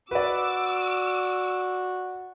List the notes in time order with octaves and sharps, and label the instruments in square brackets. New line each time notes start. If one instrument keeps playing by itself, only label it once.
[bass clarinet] F#4 [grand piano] B4 D5 [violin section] D6 E6